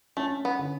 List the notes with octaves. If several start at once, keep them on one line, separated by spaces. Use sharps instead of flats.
A3 C#4
B3
D3